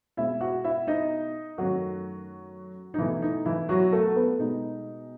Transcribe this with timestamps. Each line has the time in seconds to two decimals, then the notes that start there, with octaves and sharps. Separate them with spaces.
0.17 B2 G#3 E4 E5
0.41 F#4 F#5
0.64 E4 E5
0.87 D#4 D#5
1.58 F#2 D#3 F#3 A3 F#4
2.94 D#4
2.98 B2 E3 A3 E4
3.22 D#4
3.46 E3 E4
3.69 F#3 F#4
3.92 A3 A4
4.16 B3 B4
4.39 B2 G#3 D#4 D#5